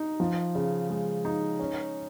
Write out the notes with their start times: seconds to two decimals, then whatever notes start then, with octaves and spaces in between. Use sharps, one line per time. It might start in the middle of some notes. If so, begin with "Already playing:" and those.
Already playing: D#4
0.20 F3
0.55 C#3
0.90 G#3
1.25 D#4
1.59 C#4